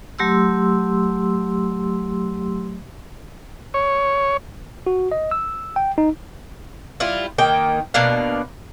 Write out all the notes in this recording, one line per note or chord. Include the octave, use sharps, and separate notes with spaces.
F#3 A3 G4 C6 E6
C#5
F#4
D#5
E6
G5
D#4
G3 E4 F4
D#3 A#3 G5
B2 A#3 D4 F5